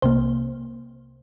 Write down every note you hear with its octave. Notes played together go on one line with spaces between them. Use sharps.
C2 C3 A#3 C5